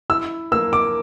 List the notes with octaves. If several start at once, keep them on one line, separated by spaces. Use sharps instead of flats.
E4 E6
A#3 E6
D6